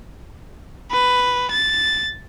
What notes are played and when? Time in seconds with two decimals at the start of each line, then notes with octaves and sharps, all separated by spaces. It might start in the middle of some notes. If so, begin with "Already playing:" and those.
0.92 B4
1.51 A6